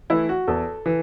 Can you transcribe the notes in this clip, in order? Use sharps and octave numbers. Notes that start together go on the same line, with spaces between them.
E3 A3 E4
F#4
E2 A4
E3